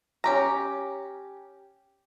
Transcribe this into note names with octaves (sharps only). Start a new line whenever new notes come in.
C#4 G4 A#5